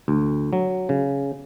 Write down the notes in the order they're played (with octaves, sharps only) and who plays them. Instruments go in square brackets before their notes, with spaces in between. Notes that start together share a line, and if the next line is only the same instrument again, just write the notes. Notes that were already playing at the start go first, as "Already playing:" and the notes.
[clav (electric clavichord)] D2
F#3
C#3